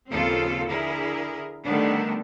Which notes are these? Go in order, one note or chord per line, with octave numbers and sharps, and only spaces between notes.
D#2 C#3 F3 C4 F4 A4
D3 E4 G#4 A#4
D3 D#3 G3 A3 B3 D4